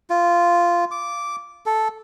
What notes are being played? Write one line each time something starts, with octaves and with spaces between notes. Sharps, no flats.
F4
D6
A4